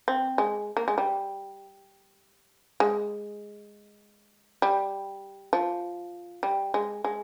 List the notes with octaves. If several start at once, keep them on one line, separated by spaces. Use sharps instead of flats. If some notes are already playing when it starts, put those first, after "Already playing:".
C4
G#3
A#3
G#3
G3
G#3
G3
F3
G3
G#3
G#3